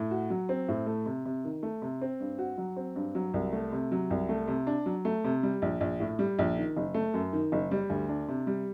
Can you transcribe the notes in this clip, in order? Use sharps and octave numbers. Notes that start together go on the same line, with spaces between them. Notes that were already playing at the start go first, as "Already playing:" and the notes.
Already playing: A2
F#4
F#3
C4
A2
A3
C3
C3
D#3
A3
C3
C4
G2
F#4
F#3
C4
G2
F#3
C2
A3
C3
F#3
C2
A3
C3
D4
F#3
A3
C3
G3
A#1
A#1
A2
G3
A#1
D#3
F#1
A3
F#2
D#3
F#1
G3
D2
D4
C3
G3